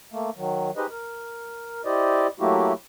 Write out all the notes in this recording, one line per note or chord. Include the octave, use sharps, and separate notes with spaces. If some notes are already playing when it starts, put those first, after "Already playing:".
A3 A#3
D#3 F#3
D#4 G4 G#4 B4 C5 D#5
A#4
E4 G4 C5 D5 D#5
F#3 A3 A#3 E4 F#4 G4